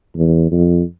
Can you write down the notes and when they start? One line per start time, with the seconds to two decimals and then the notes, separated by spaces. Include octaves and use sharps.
0.17 E2
0.51 F2